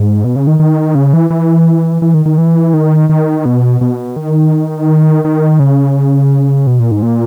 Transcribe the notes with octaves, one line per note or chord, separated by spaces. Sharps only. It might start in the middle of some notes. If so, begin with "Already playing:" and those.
Already playing: G#2
B2
C#3
D#3
D#3
C#3
E3
E3
E3
D#3
D#3
E3
D#3
D#3
B2
B2
D#3
D#3
C#3
B2
A#2
G#2
A#2